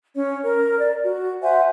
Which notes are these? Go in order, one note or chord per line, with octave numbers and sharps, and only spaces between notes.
C#4 C#5
A#4
D5
F#4
C5 E5 F#5 G#5